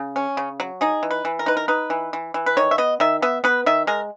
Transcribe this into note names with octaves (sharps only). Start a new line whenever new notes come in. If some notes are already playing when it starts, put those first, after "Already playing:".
Already playing: C#3
C#4
C#3
F#3
D#4 G#4
E3
B4
E3
A#4
D#4 B4
A#4
D#4 B4
E3
E3
E3
B4
D#3 C#5
E5
B3 D#5
D#3 E5
B3 E5
B3 B4
D#3 E5
G#3 A#4